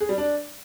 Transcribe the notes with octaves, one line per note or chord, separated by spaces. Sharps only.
G#4
G3
D4